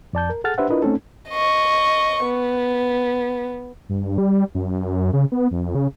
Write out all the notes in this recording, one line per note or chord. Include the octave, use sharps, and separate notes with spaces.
F2 D5 A5 G6
A#4
G#4 A4 F#5 F6 A6
D4 G4 B4 C5 E5 F#5
D4 E4 F4 A#4 B4 D#5
A3 C4 C#4 D#4 A4
D#5 C#6
B3
G2
G3
F#2
F#2
C#3
B3
F2
C#3